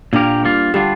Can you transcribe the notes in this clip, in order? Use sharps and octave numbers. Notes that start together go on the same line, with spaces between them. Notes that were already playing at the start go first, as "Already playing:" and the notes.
A#2 A#3 D4 G4 A#4
G3 A#3 F4
D3 G3 D4 F4 G4